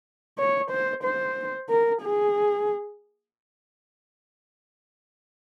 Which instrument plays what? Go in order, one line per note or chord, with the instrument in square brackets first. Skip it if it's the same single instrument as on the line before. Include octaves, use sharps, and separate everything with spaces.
[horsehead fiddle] C#5
C5
C5
A#4
G#4